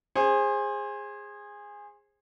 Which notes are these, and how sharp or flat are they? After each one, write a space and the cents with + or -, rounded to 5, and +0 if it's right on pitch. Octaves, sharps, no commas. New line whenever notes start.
G#4 -15 C5 +25